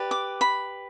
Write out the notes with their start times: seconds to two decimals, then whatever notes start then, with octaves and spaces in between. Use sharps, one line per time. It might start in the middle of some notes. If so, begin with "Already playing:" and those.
Already playing: G4 B4 D5
0.11 D6
0.41 B5